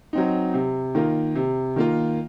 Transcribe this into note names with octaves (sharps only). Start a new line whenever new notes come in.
F#3 C4 D#4
C3
D#3 A#3 F4
C3
D#3 A#3 F4